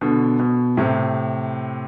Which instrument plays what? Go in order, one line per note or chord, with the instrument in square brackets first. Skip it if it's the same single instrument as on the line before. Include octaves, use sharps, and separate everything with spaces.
[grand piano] B2 D3
B2
A2 C3